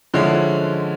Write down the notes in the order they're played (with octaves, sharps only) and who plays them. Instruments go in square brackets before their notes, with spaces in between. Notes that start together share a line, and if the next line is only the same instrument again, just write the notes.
[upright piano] D3 F3 G#3 C#4 E4